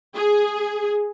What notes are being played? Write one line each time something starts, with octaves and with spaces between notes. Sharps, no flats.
G#4